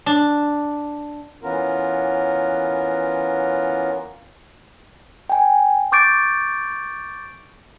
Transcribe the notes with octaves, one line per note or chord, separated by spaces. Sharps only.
D4
E3 B3 C#4 F4 A#4
G5 G#5
C#6 D6 G6 A6 D7